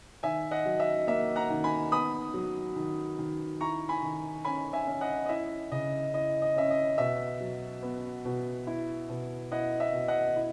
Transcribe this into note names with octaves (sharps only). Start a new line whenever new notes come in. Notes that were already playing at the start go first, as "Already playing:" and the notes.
D#3 E5 G#5
D#5 F#5
F#3
E5
A#3 E5
F#5 A#5
D#3
G#5 B5
B3 B5 D#6
F#3
D#3
D#3
E4 A#5 C#6
G#5 B5
D#3
C#4 G#5 B5
E5 G#5
C#4
D#5 F#5
D#5
E4 E5
C#3 D#5
E4 D#5
D#5
C#4 E5
D#5
B2 E5
F#3
B3
B2
E4
B2
E4 D#5 F#5
E5
B2
D#5 F#5
E4